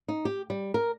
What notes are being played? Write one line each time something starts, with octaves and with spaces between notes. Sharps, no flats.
D#4
G4
G3
A#4